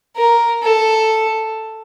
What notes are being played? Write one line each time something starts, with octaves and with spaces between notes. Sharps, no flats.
A#4
A4